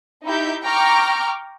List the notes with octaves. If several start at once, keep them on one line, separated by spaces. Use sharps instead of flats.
D#4 E4 G4 E5 G6
G5 A#5 C#6 D6 F6